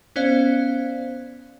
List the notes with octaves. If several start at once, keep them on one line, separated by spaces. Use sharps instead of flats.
B3 C#4 C5 D5 F5